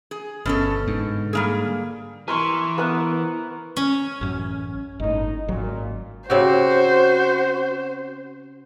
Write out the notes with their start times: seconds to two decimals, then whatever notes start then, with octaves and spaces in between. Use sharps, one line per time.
0.11 G#4
0.46 G1 B2 C#4 A4
0.88 G#2 D3
1.33 G3 A#3 G#4
2.28 E3 A#4 C6 C#6
2.78 B3 A#4 F#5
3.76 C#4
4.21 A1 F#2
5.00 G1 A2 D#4 D#5
5.48 G#1 A#2 F#3
6.30 C#3 C4 F#4 G4 C5